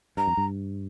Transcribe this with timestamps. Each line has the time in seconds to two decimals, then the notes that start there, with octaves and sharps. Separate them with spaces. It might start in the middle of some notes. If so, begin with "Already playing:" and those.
0.17 G2 A#5
0.27 F2
0.37 G2